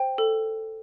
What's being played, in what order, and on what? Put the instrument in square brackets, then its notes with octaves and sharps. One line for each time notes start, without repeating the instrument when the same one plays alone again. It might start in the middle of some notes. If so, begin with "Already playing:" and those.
Already playing: [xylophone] C5 G5
A4